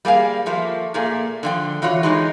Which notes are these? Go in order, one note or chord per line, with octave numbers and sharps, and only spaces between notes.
G3 A#3 G#4 F5
F3 A3 A#3
A#2 A3 A#3 G#4
D3 F3 G5
E3 F4 F#4 C#5
E3 G#3 D#4